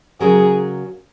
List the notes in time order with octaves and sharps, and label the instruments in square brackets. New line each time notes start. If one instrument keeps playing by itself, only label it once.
[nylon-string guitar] C#3 F#3 C#4 F#4 A#4 [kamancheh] G#4